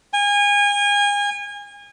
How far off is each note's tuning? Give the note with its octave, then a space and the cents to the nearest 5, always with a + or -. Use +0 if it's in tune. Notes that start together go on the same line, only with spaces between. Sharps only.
G#5 -30